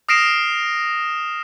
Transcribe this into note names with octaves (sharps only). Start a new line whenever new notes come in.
D#6 F6 A#6 C7 D7 E7